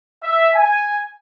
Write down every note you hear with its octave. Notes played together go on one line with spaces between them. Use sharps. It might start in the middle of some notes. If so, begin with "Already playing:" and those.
E5
G#5